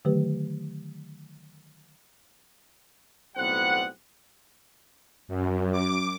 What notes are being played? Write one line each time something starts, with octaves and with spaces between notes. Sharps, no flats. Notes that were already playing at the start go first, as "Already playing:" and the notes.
D3 D#3 F#3 A3 G4 B4
B1 A2 G3 B3 C4 F#5
F#2
D6